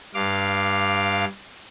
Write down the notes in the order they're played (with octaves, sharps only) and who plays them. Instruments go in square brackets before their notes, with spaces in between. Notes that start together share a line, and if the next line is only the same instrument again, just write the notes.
[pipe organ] G2 F5 D6